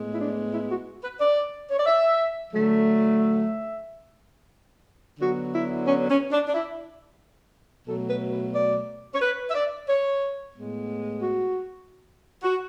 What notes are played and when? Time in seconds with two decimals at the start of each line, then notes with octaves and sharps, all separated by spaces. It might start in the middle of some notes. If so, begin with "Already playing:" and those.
Already playing: A2 G#3 B3
0.13 E4
0.19 D4
0.52 E4
0.69 F#4
1.03 B4
1.19 D5
1.69 C#5
1.78 D5
1.86 E5
2.53 D3 F#3 A3
3.19 E5
5.20 D3 F#3 B3 F#4
5.53 E4
5.87 C#4
6.09 C#4
6.31 D4
6.47 D4
6.54 E4
7.87 B2 F#3 A3 A4
8.09 B4
8.32 B4
8.54 D5
9.13 C#5
9.21 B4
9.49 E5
9.54 D5
9.88 C#5
10.54 A2 G#3 B3
11.21 F#4
12.43 F#4